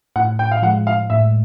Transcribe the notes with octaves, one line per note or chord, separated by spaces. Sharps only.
A2 F#5
G5
F5
F3 G#3 F#5
F5
A2 E5